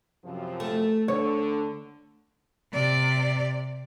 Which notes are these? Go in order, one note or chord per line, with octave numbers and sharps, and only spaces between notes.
F#2 C3 F3
A3
D2 D3 C#5
C3 D5